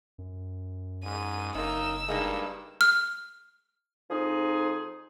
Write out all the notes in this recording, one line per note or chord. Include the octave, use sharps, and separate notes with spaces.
F#2
G#2 D#7
F#1 F#2 A#3 D#4 E6
G2 G#3 A#3 D#4
F6
F2 F3 D#4 G#4